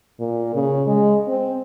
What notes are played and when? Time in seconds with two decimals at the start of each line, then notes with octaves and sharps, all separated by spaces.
0.20 A#2
0.55 C#3
0.87 G#3
1.28 C4